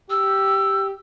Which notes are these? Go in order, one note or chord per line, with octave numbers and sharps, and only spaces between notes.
G4 E6